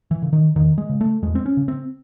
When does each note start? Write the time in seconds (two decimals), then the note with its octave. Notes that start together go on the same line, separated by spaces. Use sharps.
0.11 E3
0.22 C#3
0.33 D#3
0.55 E2 D#3
0.78 G#3
0.89 C#3
1.01 A3
1.22 E2 G#3
1.35 C4
1.46 C#4
1.57 C#3
1.68 C4